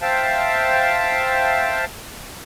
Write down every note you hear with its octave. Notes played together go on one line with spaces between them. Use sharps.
C5 E5 F5 G5 A5